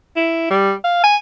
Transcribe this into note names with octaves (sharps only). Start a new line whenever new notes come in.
E4
G3
F5
G#5